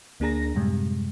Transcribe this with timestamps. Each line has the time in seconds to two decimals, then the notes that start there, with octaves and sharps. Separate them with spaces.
0.20 D2 A#3 D4 G#4 A#5 A#6
0.55 F#2 A2 C3 G3 G#3